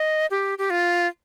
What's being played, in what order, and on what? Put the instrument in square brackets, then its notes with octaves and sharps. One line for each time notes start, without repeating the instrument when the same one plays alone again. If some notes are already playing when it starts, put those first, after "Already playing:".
Already playing: [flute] D#5
G4
G4
F4